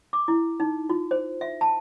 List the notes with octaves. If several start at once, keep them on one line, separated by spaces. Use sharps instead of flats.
D6
E4
D#4
F4
C5
E5
A5